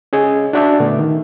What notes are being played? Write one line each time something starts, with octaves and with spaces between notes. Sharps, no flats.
C#4 G#4 D#5
D4 F#4 D5 E5 A5
A#2 D3 A3 B3
D#3